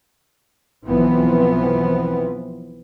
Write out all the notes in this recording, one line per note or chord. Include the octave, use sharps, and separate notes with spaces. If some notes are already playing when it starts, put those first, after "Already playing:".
B1 E3 F3 B3 C4